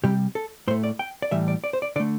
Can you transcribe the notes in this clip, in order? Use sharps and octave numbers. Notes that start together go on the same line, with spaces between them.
C3 G3 G4
A4
A2 A3 C5
D5
G5
D5
A2 E3 G3 E5
D5
D5
C5
D5
D3 A3 D5